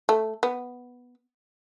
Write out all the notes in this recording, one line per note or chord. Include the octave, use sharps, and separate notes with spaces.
A3
B3